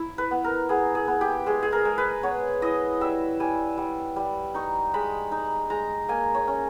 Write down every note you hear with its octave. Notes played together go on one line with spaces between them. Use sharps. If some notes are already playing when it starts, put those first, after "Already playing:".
Already playing: E4
B4
B3
A#4
B3 G#4
G#4
B3
G4
G#3 G#4
G#4
A#4
G#3
B4
B3 C#5
E4 D#5
G3 E5
G3 G#5
G3
G3
D#4 C#6
G#3 B5
D#4
G#3 A#5
A#3 G#5
C#5
C#4